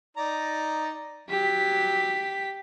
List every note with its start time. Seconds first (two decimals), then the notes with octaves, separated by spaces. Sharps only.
0.17 D#4 D5 A#5
1.29 F#3 G4 B6